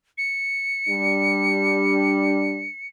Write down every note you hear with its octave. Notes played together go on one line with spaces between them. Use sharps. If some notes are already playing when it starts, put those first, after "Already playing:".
C#7
G3 D4